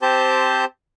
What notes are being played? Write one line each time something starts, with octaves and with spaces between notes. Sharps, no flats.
C4 G4 C5 A5 G6